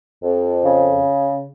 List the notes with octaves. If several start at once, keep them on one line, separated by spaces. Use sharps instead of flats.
F2
C#3